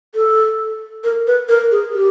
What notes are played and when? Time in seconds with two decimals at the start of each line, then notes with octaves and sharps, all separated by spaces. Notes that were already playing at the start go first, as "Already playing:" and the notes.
0.15 A4
1.04 A#4
1.27 B4
1.49 A#4
1.71 G#4
1.94 G4